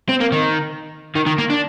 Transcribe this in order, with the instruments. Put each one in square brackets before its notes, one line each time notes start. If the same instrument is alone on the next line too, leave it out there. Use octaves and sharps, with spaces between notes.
[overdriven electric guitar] C4
A#3
D#3
D#3
D#3
A#3
D4